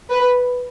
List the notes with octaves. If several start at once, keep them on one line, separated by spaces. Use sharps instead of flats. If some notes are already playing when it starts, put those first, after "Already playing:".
B4